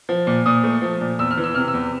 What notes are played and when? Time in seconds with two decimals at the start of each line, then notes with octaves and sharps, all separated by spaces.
0.09 F3
0.27 A#2
0.46 A#2 D#6
0.64 A3
0.82 F3
1.01 A#2
1.19 E2 E6
1.31 F6
1.37 E3
1.44 E6
1.55 C3 F6
1.68 E6
1.74 E2